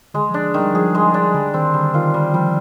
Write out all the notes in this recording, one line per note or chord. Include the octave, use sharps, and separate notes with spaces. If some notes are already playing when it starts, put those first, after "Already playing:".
D3 G#3
F3
D4
D#3 G3
F3 G#4
G#3
D4
D3 G3
D#3 C4
D3 G3
D#3 F4
D#3 G3
F3 G3